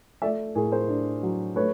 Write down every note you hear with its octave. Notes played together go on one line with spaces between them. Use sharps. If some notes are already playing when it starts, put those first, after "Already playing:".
A3 D5 E5
A2 G#4 A#4
A#4 C5
D4
F#3
A3 B4 C#5